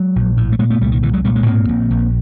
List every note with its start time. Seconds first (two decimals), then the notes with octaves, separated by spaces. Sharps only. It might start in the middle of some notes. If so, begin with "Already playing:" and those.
Already playing: F#3 G#3
0.16 A#1
0.37 A2
0.52 A3
0.59 A#2 G#3 A#3
0.70 A3 B3
0.81 C2 G3 A3
0.92 D#3
1.03 C2 D3 E3
1.13 F#3 G#3
1.25 A#2 G3 A3
1.35 G#3 A#3
1.46 G#2 A#3 C4
1.69 A#1
1.91 A#1